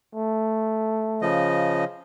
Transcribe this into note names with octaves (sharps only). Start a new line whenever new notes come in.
A3
C#3 F3 D#5